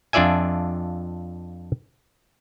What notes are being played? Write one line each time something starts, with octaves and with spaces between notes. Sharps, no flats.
F2 D4 F4 D5 E5 G#5